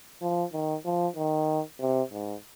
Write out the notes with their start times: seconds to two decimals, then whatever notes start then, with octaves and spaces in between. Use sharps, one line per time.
0.22 F3
0.53 D#3
0.85 F3
1.16 D#3
1.80 C3
2.12 G#2